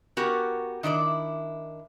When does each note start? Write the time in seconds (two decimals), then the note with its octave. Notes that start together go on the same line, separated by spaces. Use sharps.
0.17 B3 F#4 G4 A#4
0.83 D#3 D4 E4 D5